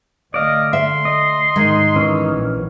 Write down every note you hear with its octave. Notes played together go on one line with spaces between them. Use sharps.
D3 A3 D5 D#5 F5
E5 C6
D#5
G#2 D#3 G#3 D#4
E3 C#4
A#1